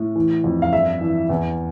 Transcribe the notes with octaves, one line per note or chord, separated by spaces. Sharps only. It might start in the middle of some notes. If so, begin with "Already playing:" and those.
Already playing: A2
E3
F2
F5
G2 E5
E3
E2